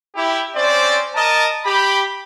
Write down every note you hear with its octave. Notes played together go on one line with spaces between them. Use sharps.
E4 G4
C4 C#4 C5 D5
A#4 D#5 A5
G4 B5